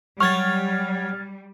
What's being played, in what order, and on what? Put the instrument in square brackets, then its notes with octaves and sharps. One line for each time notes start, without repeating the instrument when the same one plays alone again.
[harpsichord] F#3 C#5 [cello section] G3 [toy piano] C#6 [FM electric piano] F6 G#6 A6